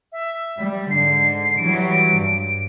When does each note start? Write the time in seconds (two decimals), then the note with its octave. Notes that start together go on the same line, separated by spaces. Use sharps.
0.12 E5
0.58 G3
0.91 G#2 D3 C7
1.57 E3 F#3 G3 D7
2.16 G2